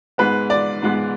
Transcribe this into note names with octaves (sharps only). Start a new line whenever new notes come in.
G#2 G#3 B3 B4
D5
G#2 G#3 B3